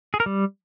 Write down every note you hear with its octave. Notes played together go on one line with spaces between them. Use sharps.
G#4
A#4
G3